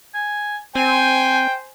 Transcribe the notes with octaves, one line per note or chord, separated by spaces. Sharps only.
G#5
C4 C5 G5 G#5